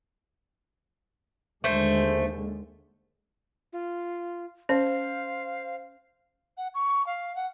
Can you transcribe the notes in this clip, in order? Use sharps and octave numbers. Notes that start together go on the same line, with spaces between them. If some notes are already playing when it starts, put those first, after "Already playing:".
D#2 D3 G#3 A3 C5
F4
C#4 C5 F5
F#5
C#6
F5
F#5